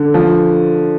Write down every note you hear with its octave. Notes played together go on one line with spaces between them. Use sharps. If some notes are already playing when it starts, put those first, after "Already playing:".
Already playing: D3
F3